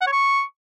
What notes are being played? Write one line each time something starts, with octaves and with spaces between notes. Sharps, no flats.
F#5
C#5
C#6